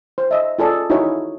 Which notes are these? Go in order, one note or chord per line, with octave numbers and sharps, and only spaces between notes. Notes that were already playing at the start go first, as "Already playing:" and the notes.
C5
D#5 E5
F4 G#4 A4 D5
D#4 E4 F#4 G#4 A#4 C#5